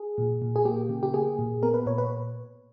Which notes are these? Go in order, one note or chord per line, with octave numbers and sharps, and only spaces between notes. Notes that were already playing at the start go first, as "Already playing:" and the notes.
Already playing: G#4
A#2
A#2
G#4
A#3 G4
C#3
G4
A#3 G#4
A#2
B3 A#4
B4
A#2 C#5
B4